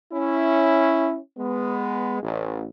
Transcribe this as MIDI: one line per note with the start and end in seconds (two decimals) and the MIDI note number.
0.11 1.17 61
0.11 1.17 64
1.37 2.21 56
1.37 2.21 59
2.22 2.64 33